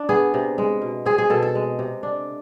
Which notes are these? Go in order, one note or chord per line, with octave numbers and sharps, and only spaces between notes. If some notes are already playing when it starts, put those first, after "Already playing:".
Already playing: D4
B3 G#4
C3
G#3
B2
C4 G#4
G#4
B2 A4
A4
G#3
C3
D4